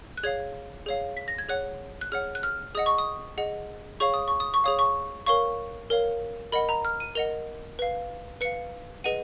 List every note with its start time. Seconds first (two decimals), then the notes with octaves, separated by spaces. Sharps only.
0.17 F#6
0.23 G#4 C#5 F5 G#6
0.86 G#4 C#5 F5
1.17 B6
1.28 A#6
1.38 G#6
1.49 G#4 C#5 F#5 F#6
2.01 F#6
2.12 G#4 C#5 F#5 F6
2.35 F#6
2.43 F6
2.75 G#4 D#5 F#5 D#6
2.86 C#6
2.98 D#6
3.38 G#4 D#5 F#5
4.00 G#4 C#5 F5 C#6
4.14 D#6
4.28 C#6
4.40 D#6
4.54 C#6
4.64 G#4 C#5 F5 D#6
4.79 C#6
5.26 A#4 C#5 F5 C#6
5.90 A#4 C#5 F5
6.52 A#4 D#5 F#5 B5
6.69 A#5
6.85 F6
7.00 D#7
7.15 A#4 D#5 F#5 F7
7.79 B4 F5
8.41 B4 F5 C#7
9.04 G#4 B4 D#5 F#5 D#7